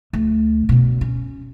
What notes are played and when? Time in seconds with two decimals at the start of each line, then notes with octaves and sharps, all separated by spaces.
0.13 D2
0.69 B2 D3
1.01 C#4